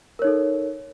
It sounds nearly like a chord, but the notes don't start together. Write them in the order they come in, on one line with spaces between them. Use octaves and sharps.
A#4 C#5 D#4 A4